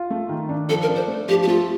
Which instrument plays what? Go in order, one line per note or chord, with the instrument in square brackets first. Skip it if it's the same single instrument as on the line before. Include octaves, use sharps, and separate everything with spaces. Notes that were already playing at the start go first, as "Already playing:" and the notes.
Already playing: [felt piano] F4
A3
D#3
D4
[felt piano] F3 [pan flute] A4
[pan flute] A#4
[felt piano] D4
[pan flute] C5
[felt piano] A3
[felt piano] F3 [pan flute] G4
[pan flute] G4
[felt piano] A3 [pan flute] F4